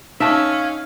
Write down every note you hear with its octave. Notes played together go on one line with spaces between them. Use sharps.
C#4 D#4 E5 F5 A5